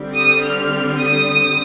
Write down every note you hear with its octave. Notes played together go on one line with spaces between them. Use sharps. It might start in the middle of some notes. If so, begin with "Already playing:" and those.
Already playing: D3 G3 C4
D#6
F6
D#6